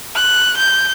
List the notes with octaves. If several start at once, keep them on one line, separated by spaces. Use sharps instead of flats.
F#6
G6